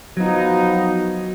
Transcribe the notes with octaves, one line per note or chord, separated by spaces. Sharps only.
F3 F#3 B3 D#4 F#4